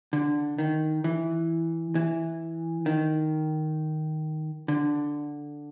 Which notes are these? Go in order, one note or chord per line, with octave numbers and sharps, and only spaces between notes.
D3
D#3
E3
E3
D#3
D3